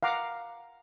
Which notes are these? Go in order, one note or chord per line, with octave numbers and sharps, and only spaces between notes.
F5 F#5 A#5 D6